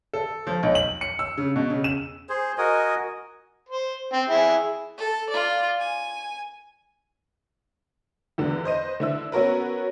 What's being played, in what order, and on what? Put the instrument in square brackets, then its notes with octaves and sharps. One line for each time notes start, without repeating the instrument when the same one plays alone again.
[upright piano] A4
F3
B1
F#7
C#7
E6
C#3
B2
C#3
E7
[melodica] G#4 C5
F#4 A#4 D#5 G#5
[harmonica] C5
C4
E4 G#4
[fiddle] A4
F4 D5
G#5
[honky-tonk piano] E2 D3
B4 C5 D#5 D#7
D3 E4 E6
B3 C#4 F#4 A#4 B4